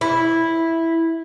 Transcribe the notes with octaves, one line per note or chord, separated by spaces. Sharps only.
E4